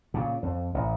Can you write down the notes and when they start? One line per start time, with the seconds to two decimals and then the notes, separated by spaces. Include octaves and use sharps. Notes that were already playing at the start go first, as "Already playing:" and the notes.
0.14 A#2 C#3
0.43 F2
0.74 A1